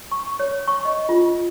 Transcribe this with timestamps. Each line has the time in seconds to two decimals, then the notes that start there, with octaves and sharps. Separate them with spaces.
0.12 C#6
0.40 C#5
0.68 C#6
0.85 D#5
1.09 F4